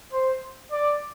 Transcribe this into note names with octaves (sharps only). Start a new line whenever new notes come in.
C5
D5